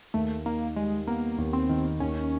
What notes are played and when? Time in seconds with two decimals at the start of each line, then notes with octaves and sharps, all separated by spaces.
0.14 D#2 A3
0.46 D#3 A#3
0.76 G3 G#3
1.07 A#3 B3
1.38 D#2
1.53 C4
1.69 D#3
2.00 D#2 C#4